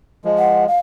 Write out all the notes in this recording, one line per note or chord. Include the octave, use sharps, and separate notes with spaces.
F3 G#3
F#5
F5